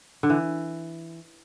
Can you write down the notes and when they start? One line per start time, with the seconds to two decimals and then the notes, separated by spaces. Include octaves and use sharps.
0.23 D3
0.30 E3